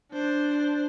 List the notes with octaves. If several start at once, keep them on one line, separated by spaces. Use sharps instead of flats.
D4 C5